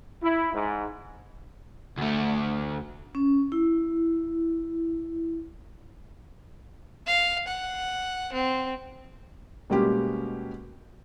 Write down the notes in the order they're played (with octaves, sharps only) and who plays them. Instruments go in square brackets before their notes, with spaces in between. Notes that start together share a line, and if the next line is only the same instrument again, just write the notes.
[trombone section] E4
G#2
[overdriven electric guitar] D2 A3
[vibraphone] C#4
E4
[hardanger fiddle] F5
F#5
C4
[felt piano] B2 G3 G#3 A#3 C#4 G4